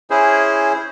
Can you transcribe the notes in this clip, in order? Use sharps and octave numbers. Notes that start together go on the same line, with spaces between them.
C#4 E4 G#4 C5